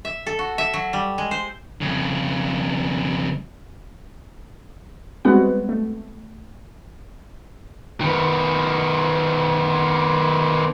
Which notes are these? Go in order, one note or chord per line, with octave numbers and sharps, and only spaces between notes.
E5
A4
F#4
E5
F#3
G3
G#3
C5
F2 C#3
G3 G#3 B3 C4 F#4 F#5
A3
D#3 B3